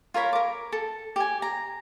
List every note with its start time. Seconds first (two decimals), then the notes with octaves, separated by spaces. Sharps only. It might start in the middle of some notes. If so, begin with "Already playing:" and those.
0.14 F4 A#4 C#5 B5
0.33 A#4 D6
0.72 A4
1.16 G4 G#5
1.42 A#5